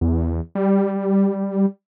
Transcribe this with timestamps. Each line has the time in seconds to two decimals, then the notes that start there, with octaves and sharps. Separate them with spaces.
0.01 E2
0.55 G3